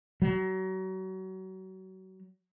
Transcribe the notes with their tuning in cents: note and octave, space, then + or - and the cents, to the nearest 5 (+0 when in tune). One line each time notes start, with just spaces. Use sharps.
F#3 +30